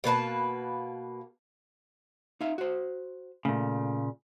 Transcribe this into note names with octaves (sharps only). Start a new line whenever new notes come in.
B2 A#3 B4 A5
D#4 E5 F5
F#4 C5
A#2 C#3 A3